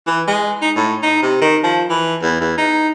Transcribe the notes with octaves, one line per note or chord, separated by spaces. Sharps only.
E3
G#3
D#4
A2
D#4
C3
D#3
F3
E3
E2
E2
D#4